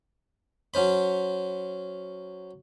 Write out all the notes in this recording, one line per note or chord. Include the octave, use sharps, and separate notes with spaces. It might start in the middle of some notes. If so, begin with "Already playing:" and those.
F#3 C#4 C5 B5